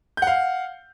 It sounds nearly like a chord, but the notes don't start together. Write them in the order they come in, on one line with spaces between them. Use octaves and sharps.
G6 F#5 F5